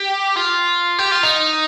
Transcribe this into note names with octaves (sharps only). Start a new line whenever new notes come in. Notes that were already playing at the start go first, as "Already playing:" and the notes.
Already playing: G4
F4
G4
F4
D#4